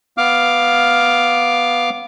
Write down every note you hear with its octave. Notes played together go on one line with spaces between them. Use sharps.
B3 F5 D6 F6